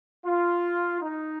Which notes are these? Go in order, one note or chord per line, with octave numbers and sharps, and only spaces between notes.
F4
D#4